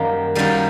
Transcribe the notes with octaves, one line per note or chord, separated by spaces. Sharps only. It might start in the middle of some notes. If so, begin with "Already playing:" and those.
Already playing: F#2 D#3 G3 A#3
F#2 D#3 G3 A#3